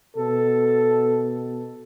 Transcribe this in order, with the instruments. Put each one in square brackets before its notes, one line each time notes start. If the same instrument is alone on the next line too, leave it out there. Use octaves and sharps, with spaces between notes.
[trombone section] B2 A4